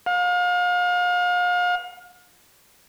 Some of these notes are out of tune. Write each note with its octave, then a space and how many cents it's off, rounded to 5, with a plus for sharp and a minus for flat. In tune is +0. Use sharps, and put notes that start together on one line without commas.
F5 +35